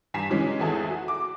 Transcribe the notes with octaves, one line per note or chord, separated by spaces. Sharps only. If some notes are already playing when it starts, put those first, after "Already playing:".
G2 G#5 A#5 B6 C7 E7
C#3 E3 F#3 G#3 C#4
G#1 E2 G#4 A4 E5 G#5
F#4
D6